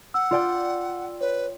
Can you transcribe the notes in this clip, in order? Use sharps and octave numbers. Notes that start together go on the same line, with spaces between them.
F#5 E6
F4 D5 G5
B4 C#5